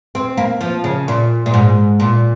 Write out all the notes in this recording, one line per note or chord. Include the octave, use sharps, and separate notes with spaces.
C4
A#3
F3
C#3
A#2
A#2
G#2
A#2